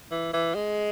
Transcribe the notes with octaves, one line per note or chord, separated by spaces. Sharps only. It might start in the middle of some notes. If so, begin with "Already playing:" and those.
E3
E3
G#3